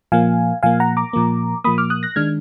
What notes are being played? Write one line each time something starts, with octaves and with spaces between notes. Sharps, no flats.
A#2 F3 A#3 F5 G#5
A#2 F3 A#3 F5 G#5
F#5 A#5
A#5 D6
A#2 F3 A#3
A#2 F3 A#3 B5 D#6
D6 F6
D#6 F#6
F#6 A#6
D#3 G#3 D4 F6 G#6